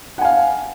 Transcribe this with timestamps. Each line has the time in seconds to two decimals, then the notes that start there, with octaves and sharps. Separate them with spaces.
0.18 F#5
0.21 G#5
0.25 F5